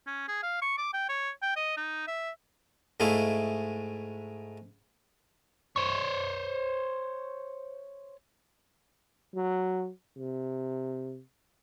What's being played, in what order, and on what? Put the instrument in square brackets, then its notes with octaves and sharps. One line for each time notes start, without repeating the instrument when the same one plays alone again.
[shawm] C#4
G#4
F5
C#6
D6
G5
C#5
G5
D#5
D#4
E5
[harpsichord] G#2 G#3 A3 E4 F5 C#6
[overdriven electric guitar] C5 C#5
[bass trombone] F#3
C3